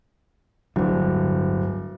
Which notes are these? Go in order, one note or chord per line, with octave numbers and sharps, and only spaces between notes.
D1 G1 G2